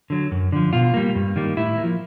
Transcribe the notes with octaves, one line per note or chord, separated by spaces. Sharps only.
D3 F#3
F#2
D3 F3
B2 F4
G3 A#3
G2
D#3 G3 A#3
A2 E4
A#3
F3